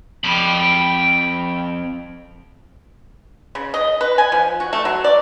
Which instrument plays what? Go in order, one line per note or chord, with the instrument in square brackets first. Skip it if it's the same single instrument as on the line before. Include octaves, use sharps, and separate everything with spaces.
[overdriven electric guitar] F2 [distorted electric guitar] G5 B5
[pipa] C#3
D#5
B4
G#5
F3
F#4
A3
F#3
D5